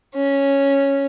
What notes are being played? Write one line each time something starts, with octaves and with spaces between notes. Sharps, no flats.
C#4